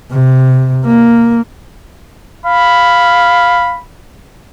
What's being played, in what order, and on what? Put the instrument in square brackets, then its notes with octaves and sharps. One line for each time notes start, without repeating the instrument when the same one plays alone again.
[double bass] C3
A#3
[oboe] F5 [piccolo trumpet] B5